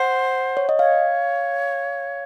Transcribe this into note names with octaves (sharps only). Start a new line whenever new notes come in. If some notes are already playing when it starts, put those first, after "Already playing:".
Already playing: C5 F#5
C#5
D#5
C#5 F5